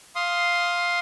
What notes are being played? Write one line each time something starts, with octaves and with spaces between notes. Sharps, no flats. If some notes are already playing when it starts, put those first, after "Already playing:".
F5 C6 D#6